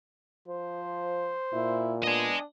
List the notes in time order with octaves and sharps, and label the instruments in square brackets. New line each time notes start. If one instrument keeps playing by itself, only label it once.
[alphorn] F3 [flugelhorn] C5
[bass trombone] A#2 [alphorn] E4
[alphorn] B3 [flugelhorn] D4 [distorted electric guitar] D#5 G#5